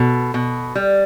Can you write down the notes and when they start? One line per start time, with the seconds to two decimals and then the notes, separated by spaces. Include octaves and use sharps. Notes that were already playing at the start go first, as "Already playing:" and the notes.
Already playing: B2 A4
0.34 B2
0.75 G3